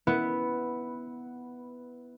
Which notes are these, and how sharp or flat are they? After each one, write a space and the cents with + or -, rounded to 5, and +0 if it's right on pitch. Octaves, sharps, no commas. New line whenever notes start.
B3 +0 E4 -10